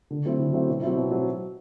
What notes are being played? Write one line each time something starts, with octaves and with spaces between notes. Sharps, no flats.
D3
F#3 A3 C4 E4
D3
F#3 A3 C4 E4
B2
F#3 C4 E4
B2
F#3 C4